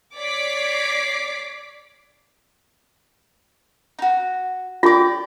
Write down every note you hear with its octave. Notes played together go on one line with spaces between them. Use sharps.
C#5 D5 D6 B6 C7
D#4 F#4
F4 G#4 D5 G5